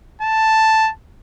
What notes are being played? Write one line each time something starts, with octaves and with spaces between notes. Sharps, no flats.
A5